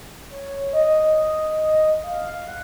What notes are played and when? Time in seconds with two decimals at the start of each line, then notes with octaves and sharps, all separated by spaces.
0.30 C#5
0.73 D#5
2.04 F5
2.47 F#5